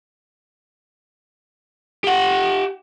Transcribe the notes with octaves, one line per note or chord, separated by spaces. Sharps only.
G4 F#5